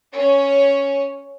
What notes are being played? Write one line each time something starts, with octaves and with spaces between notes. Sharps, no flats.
C#4